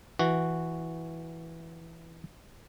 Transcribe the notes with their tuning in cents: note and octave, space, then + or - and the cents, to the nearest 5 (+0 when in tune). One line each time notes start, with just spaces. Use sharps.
E3 +0 F#4 +0